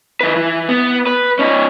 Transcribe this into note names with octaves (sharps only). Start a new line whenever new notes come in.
D#3 B4
E3
B3
B4
C#4 D#4